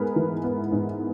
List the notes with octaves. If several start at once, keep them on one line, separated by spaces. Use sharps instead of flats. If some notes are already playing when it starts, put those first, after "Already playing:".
Already playing: G#2 G#3 B3 G#4 A#4 B4
E3
B3
G#2